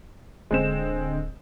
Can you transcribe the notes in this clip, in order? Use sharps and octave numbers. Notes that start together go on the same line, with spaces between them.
D1 D3 G#3 C4 E7